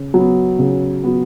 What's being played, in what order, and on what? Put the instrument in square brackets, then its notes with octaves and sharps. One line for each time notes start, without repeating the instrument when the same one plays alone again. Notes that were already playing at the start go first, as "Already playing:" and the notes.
Already playing: [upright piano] C#3
F#3 B3
C#3
F#3 B3